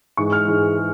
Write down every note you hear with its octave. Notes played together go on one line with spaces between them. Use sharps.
G#2 E3 G#3 C#6
F6
G#2 E3 G#3
G#3